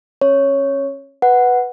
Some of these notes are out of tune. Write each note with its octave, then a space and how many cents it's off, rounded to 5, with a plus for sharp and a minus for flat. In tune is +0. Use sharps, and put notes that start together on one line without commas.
C#4 -25 C#5 +0
B4 +0 F#5 +0